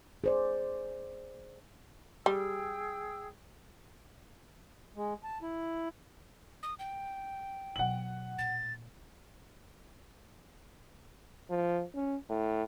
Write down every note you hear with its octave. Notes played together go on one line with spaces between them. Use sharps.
G#4 C5 D5
G3 G#4 G5 E6
G#3
A5
E4
D#6
G5
B2 F#3 F#5 F#7
A#2 A6
F3
C#4
A2